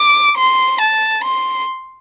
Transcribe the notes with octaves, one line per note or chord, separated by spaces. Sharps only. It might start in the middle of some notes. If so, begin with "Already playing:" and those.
Already playing: D6
C6
A5
C6